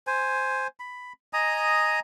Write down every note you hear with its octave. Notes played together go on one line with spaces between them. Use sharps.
C5 G#5
B5
D#5 G#5 A#5 D#6